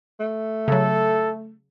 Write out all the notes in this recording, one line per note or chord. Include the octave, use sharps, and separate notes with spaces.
A3
C#3 F#3 A4